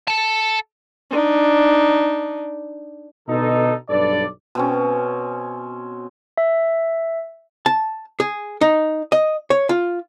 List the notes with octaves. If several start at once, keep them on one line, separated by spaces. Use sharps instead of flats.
A4 A5
D4 D#4
B2 D3 D#4 A4
B1 G2 A4 B4 D5
B2 C4 C#4
E5
A5
G#4
D#4
D#5
C#5
F4